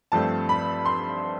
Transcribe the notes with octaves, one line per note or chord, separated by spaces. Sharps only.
G2 F3 A3 C4 A5
B5
C6